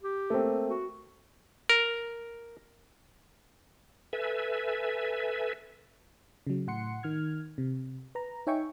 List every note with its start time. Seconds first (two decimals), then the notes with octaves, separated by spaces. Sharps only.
0.03 G4
0.30 A3 A#3 C4
0.68 F#4
1.69 A#4
4.13 A4 B4 E5 G#5
6.47 C#3 F#3
6.67 A2 F#5 C6 C#7
7.03 D#3 F6 G#6
7.58 C3
8.15 B4 A#5
8.47 D#4 C#5 E5 G5 G#5 C#6